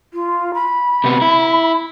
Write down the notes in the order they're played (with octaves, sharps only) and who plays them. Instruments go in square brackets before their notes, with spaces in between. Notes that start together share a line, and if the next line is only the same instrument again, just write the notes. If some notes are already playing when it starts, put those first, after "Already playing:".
[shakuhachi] F4
B5
[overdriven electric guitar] C3 B3
E4